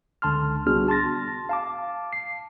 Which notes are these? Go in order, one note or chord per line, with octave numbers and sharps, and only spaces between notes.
C#2 D3 A5 C6 F6
C2 B3 D4 F#4 G#4 F6
A5 C6 A6 A#6
F5 A5 D6
C7